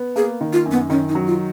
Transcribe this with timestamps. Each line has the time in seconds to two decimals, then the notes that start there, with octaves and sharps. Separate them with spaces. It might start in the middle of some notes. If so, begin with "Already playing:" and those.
Already playing: B3
0.16 A#3 G#4
0.41 D#3
0.53 F4
0.65 F#2
0.71 B3
0.90 D#3 C#4
1.09 D#4
1.15 F#3
1.27 F4